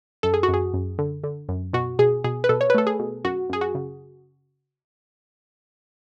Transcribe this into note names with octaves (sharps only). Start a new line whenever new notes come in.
F#2 A4
G#4
F#4
F#2
G#4
F#2
D3
D3
F#2
B2 F#4
B2 G#4
B2 G#4
B4
B2 A4
C#5
B4
A3 A4
G#4
B2
F#2 F#4
F#2 G#4
F#4
C#3